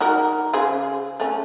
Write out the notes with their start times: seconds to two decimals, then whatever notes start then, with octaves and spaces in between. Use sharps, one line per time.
0.01 D#4 F#4 A#4
0.54 C#3 G#4 C5
1.20 A3 C#4